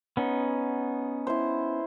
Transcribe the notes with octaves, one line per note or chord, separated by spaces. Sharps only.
B3 C#4 D#4
E4 C5